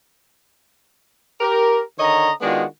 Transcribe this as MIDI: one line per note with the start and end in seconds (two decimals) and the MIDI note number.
1.40 1.81 67
1.40 1.81 70
1.98 2.30 50
1.98 2.30 51
1.98 2.30 73
1.98 2.30 75
1.98 2.30 82
2.41 2.64 51
2.41 2.64 56
2.41 2.64 59
2.41 2.64 62
2.41 2.64 65
2.41 2.64 66